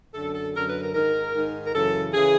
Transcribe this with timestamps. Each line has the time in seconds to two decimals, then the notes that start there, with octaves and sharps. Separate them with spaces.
0.14 F#2 D3 A4
0.34 A4
0.55 F#2 D3 A#4
0.68 B4
0.81 A#4
0.94 G#2 D#3 A#4
1.34 G#2 D#3
1.66 A#4
1.74 F#2 C#3 E3 A4
2.14 C#3 E3 G#4